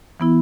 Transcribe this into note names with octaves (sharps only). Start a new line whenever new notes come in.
E3 B3 E4